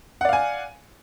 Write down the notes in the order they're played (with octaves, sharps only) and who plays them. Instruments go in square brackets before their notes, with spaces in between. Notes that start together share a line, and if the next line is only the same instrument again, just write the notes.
[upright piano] F#5
D5
F5
G#5